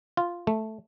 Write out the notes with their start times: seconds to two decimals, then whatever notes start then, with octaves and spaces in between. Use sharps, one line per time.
0.17 F4
0.47 A3